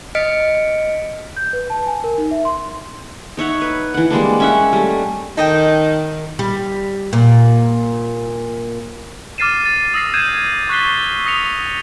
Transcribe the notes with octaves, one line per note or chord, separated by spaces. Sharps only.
D#5 F6 B6 C#7 D7
G6
B4
A5
G#5
A#4
D#4
E5
C6
D#4 C#5 E5 F#5
B4
E3 F#5
G3 G#3 A#3 D4
C#4 E5 F#5
G3 A3
D#3 D#4 A4 D#5 G5
G3
A#2
D6 F6 A6 C7 D#7 E7
A6
D#6 E6 A#6 C7
G6 G#6 D#7 E7
C#6 F#6 A6 B6 C7 G7
D#6 A#6 C#7 F7